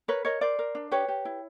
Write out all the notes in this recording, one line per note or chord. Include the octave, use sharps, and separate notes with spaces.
A#4 B4 C#5
A#4 C#5 D#5
A#4 C5 D5
A#4
D4
G4 B4 C#5
G4
E4